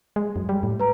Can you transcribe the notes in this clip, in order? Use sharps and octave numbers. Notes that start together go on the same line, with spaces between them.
G#3
F#2
G3
A2
B4 A#5